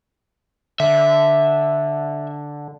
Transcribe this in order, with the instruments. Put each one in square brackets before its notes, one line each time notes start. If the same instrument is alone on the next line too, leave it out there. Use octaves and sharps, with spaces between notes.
[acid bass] D3 [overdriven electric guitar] E5